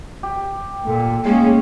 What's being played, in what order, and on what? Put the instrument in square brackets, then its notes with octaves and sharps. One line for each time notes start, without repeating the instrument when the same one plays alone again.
[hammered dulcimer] G4
[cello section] A#2 [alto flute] A4
[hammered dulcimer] A2 [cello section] G#3 C#4 [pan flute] A#3 [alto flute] G#4